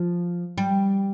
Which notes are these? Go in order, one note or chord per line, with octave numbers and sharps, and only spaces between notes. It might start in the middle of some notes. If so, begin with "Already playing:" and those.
Already playing: F3
G3